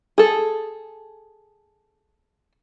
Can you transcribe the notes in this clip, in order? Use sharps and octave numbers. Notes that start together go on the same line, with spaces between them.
G#4 A4